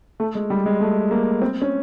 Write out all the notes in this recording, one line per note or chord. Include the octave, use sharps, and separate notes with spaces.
A3
G#3
G3
G#3
A3
A#3
C4
C#4